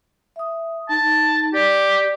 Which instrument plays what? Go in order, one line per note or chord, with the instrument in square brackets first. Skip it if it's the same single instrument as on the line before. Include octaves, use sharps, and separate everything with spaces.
[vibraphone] E5 D#6
[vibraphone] D#4 A4 [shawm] A5
[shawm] G4 [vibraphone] D5 D6